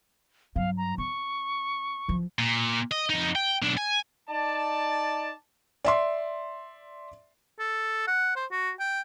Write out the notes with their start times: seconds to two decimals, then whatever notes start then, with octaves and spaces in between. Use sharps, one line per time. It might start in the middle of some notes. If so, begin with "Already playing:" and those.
0.56 G2 F#3 F5
0.77 A#5
0.98 C4 C#6
2.08 E3 F3
2.39 A#2
2.92 D#5
3.10 F2 D#4
3.35 G5
3.62 B1 D4
3.77 G#5
4.30 D#4 D5 A5
5.85 D5 E5 C6
7.59 A4
8.08 F#5
8.36 C5
8.51 F#4
8.80 G5